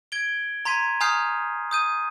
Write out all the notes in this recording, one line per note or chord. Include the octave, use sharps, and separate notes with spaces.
G#6 D7 G7
A#5 C6 G#6 B6 D#7
G#5 A#5 D#6 F6 G6 C7
D#6 G6 D#7